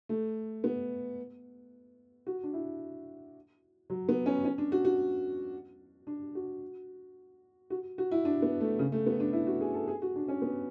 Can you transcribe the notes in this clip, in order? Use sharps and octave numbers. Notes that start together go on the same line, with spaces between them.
A3
B3
F#4
D4
E4
F#3
B3
C#4
C#4
D4
F#4
F#4
D4
F#4
F#4
F#4
E4
D4
B3
A3
C#3
A3
B3
D4
E4
F#4
G#4
A4
G#4
F#4
D4
C#4
B3